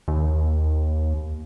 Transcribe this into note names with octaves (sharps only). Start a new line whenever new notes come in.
D#2